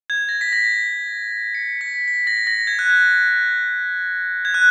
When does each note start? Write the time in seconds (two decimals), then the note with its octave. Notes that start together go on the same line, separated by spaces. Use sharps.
0.10 G#6
0.29 A#6
0.41 B6
0.53 A#6
1.55 C#7
1.81 B6
2.08 B6
2.27 A#6
2.47 A#6
2.67 G#6
2.79 F#6
2.90 G#6
4.45 G#6
4.54 F#6